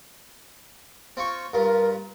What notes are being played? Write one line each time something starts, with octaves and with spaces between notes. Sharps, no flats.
C4 F4 C#6
G2 F4 A#4